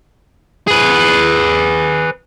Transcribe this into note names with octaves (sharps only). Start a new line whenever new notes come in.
G#4 B4